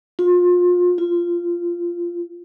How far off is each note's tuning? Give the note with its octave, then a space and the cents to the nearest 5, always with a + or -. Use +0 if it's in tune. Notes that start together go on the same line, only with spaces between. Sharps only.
F4 +30
F4 -10